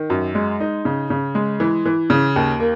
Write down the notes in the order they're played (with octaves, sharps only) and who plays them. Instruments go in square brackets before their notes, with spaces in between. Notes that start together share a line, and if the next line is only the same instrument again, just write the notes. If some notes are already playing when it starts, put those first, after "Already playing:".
Already playing: [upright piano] D#3
F#2
G#3
D#4
C#3
C#3
G#3
E3
E3
C#3
D#2
A#3